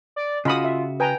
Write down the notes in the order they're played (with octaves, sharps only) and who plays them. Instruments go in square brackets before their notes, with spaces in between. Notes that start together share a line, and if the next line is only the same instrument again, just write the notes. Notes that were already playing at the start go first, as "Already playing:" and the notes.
[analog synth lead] D5
[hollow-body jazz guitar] C#3 F#4 [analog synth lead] F4 [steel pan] D#5 B5 D#6
[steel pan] E5
[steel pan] B4 G#5 A#5 [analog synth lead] G5